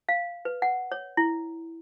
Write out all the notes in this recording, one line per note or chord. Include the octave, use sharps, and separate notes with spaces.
F5
B4
F#5
C#5
E4